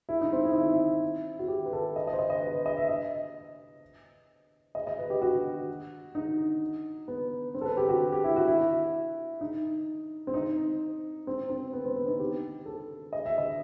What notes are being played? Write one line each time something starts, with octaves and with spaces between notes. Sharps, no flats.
E4
D#4
C4
E4
D#4
E4
F#4
G4
B4
A4
D#5
D#5
C5
D#5
D#5
B4
D#5
E5
D#5
D#5
D#5
B4
G4
F#4
D#4
B3
C4
A4
B4
G4
F#4
G4
E4
F#4
E4
D#4
C4
D#4
C4
C4
B3
C4
B3
D#4
G4
A4
D#5
E5
D#5